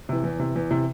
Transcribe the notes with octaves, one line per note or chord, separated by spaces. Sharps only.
C3 E3
E2
C3 E3
E2
C3 E3